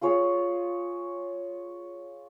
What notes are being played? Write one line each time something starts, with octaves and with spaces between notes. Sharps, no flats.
F4 G#4 C#5 G#5